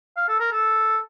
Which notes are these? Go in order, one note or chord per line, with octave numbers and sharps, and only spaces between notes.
F5
A4
A#4
A4